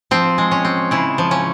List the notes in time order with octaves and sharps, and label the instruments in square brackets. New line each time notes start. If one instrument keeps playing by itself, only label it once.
[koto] F3 C4
G#3
C#4
C4
C#3 E4
F3
C#4